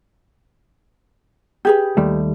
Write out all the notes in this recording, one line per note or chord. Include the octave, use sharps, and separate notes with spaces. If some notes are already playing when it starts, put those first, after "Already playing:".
G4 G#4 B4
D#2 G3 A3